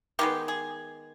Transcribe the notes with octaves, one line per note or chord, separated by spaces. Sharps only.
D#3 G#3 B3 G4
G#4